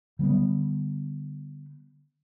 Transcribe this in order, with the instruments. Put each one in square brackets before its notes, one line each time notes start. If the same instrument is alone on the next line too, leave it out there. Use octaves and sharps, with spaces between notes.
[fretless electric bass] D3 G3 A3 B3